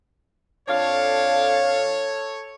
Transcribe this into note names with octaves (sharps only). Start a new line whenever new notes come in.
F2 D4 A4 C#5 F5